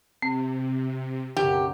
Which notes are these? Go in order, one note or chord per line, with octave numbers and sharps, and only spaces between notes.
C3 C4
F#1 B1 F#3 G4